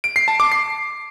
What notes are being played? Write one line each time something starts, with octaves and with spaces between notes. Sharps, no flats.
D7
C7
A5
D6
C7